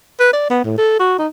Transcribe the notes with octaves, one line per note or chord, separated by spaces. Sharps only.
B4
D5
B3
A2
A4
F#4
D#4